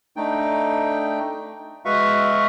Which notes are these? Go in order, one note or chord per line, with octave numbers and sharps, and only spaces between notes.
A3 D4 D#4 G5
G#3 F#4 B4 E5 F5 C#6